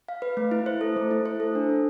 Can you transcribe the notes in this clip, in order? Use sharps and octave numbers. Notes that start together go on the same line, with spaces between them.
F5
B4
A3
E4
C5
A4
A3
E4
C5
A4
D4
A4